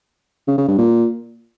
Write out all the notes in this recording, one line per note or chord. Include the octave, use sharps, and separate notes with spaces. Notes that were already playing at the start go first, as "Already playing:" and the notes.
C#3
C#3
G2
A#2